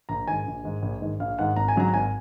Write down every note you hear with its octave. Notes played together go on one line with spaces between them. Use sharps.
A#1 A#5
G#2 D#3 G#5
A#1
G#2 D#3
A#1
G#2 D#3
A#1 F5
G#2 D#3 F#5
G#1 A#5
G#5
G#2 F#3 A#5
G#1 G#5